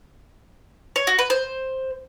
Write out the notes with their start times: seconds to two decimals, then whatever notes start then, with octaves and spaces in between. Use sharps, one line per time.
0.96 C#5
1.07 F#4
1.19 B4
1.30 C5